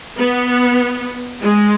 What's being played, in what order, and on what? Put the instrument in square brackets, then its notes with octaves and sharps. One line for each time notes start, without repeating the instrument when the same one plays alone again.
[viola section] B3
G#3